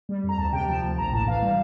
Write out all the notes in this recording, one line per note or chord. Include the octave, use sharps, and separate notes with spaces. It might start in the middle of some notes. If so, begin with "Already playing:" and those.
G3
F2
A#5
D2 A5
C3 G5
F3 A5
D2
A#1 A#5
A2 A5
E3 F5
G3